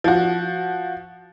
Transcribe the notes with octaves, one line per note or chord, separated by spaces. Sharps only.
F3 F#4